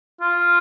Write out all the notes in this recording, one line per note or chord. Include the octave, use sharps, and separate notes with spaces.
F4